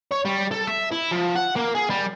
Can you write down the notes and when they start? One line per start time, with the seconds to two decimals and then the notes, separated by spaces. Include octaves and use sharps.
0.12 C#5
0.25 G3
0.52 A4
0.67 E5
0.92 E4
1.11 F3
1.36 F#5
1.56 A#3
1.75 G#4
1.90 G3